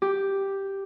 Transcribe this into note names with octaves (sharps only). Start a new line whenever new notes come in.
G4